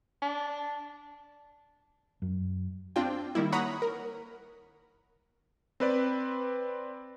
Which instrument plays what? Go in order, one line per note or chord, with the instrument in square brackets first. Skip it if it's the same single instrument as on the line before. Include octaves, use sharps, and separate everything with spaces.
[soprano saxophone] D4
[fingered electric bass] F#2
[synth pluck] C4 D4 F4 G5
D#3 G3 A#3 E4
C#5 F#5 A#5 B5 D#6
A#4
[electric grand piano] C4 B4 D5